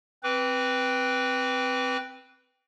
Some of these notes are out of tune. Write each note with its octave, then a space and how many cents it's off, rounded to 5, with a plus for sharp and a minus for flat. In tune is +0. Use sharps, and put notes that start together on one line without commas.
C4 +0 B4 +0 D6 -35